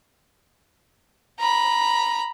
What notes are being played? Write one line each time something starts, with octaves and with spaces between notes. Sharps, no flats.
A#5 B5